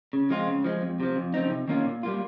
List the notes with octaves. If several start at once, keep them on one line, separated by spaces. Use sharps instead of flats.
C#3
F3 G#3 C4 F4
C#3
F3 G#3
F2
C3 F3
F2
C#3 F3 C4 D#4
C3
D#3 A#3 C#4 F4
A#2
G3 A#3 F4